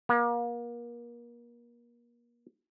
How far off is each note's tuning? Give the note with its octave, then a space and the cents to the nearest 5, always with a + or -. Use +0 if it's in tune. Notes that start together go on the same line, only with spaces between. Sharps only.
A#3 +35